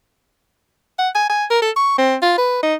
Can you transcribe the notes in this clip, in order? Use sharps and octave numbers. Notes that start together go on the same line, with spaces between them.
F#5
G#5
G#5
A#4
A4
C#6
C4
F4
B4
D#4